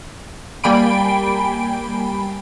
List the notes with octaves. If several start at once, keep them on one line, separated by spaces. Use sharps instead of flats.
G3 A#3 G5 G#5 B5 D7